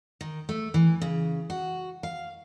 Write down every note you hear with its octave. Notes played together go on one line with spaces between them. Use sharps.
D#3
A3
E3
C#3
F#4
F5